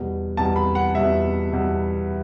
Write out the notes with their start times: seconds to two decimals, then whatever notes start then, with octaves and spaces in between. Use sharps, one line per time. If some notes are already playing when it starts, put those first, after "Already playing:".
Already playing: E2 B2 G3
0.37 E2 B2 G3 A5
0.56 B5
0.75 F#5
0.95 E2 B2 G3 E5
1.52 E2 B2 G3